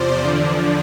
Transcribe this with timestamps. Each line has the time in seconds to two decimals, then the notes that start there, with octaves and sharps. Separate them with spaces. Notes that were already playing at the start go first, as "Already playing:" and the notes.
Already playing: E2 C3 F3 C5 D5
0.24 E2 D3 F3